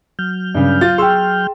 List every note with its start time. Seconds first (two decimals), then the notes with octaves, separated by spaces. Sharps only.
0.19 F#3 F6 G6
0.55 G2 C#3
0.81 F4 A6
0.98 G#4 G5 C6 E6